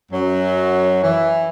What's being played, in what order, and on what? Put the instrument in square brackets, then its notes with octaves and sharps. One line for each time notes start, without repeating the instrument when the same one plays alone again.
[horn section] F#2 F#3
E3